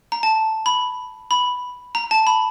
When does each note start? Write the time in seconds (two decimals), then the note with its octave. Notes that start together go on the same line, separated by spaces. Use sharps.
0.12 A#5
0.23 A5
0.66 B5
1.31 B5
1.95 A#5
2.11 A5
2.27 B5